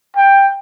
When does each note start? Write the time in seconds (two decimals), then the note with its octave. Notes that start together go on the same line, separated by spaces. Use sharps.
0.17 G5